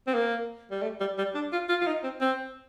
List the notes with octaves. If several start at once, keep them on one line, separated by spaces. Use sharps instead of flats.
C4
A#3
G3
A3
G3
G3
D4
F4
F4
F4
D#4
C4
C4